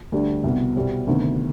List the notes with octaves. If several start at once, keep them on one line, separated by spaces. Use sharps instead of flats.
D2 D3 G3 D4
C2 B2 B3
C2 B2 G3 C4
D2 C3 D#3 B3